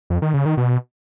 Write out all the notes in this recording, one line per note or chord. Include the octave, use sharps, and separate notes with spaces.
F2
D#3
C#3
D#3
B2